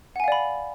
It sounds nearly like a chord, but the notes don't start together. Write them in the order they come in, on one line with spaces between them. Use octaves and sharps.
F#5 G#5 F5 D5 B5